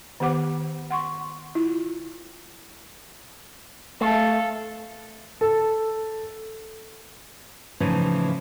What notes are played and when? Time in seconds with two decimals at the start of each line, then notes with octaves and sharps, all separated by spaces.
0.20 D#3 B3 G4 C5 F#5 D6
0.90 F#5 C6 C#6
1.55 E4 F4
4.01 A3 A4 F5
5.41 A4
7.80 A2 C#3 E3 F3 D#4